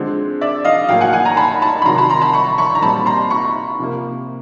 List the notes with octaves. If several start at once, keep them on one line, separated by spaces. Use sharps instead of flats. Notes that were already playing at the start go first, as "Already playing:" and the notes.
Already playing: D3 F3 G#3 C4
D5 E5
D#5 F5
A2 F#3 A#3 F5 G5
F#5 G#5
F#5 G#5
G#5 A#5
A5 B5
A5 B5
B5
C3 D#3 F#3 A#5 C6
A5 B5
A#5 C6
A5 B5
B5 C#6
B5 C#6
A#5
A#2 G3 C4 A5 B5
A#5 C6
B5 C#6
C3 F3 A#3